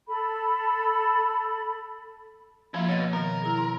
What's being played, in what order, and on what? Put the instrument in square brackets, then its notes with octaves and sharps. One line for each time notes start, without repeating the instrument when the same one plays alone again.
[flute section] A4 B5
[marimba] F3 A#3 [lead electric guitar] E4 F4
[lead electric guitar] B2 [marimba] C#5 D#5
[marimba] B2 D#3 [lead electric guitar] A#4
[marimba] E4 G#4
C6